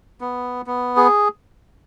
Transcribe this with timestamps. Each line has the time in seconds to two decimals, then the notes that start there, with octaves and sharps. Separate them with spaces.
0.21 B3
0.67 B3
0.97 G#4